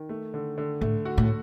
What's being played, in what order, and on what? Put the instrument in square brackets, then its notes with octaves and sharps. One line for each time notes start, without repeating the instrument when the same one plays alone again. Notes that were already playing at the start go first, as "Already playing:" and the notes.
Already playing: [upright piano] D#3
A3
D3
D3
[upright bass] A2 [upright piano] A3
[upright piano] F#4
[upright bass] A2